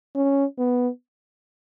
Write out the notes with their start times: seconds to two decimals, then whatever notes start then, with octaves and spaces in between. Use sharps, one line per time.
0.15 C#4
0.59 B3